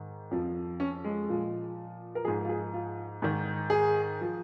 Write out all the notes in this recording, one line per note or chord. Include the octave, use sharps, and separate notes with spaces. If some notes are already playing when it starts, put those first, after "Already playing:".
Already playing: G#2 D#3
F2 F3
C#4
G#3
A#2 F3
A#4
G#2 F3 G#4
F4
G#4
F4
G#2 D#3
G#4
F3